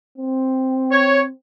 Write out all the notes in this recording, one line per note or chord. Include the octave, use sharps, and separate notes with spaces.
C4
C#5